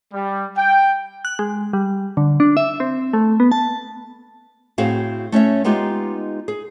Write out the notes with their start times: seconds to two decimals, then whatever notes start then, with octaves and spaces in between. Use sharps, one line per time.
0.14 G3
0.57 G5
1.25 F#6
1.39 G#3
1.73 G3
2.17 D3
2.40 D4
2.57 E5
2.80 C4
3.13 A3
3.40 B3
3.52 A5
4.78 A2 C4 F#4 G#4 F5
5.32 A3 C#4 C#5 E5
5.65 G#3 B3 D#4 F4 G4
6.48 G#4